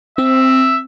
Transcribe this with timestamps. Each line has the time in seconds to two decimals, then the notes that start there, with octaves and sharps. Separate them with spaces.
0.18 C4 E5